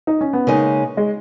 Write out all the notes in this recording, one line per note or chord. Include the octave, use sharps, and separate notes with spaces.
D#4
C#4
B3
C#3 G#3 A#3 D#4
G#3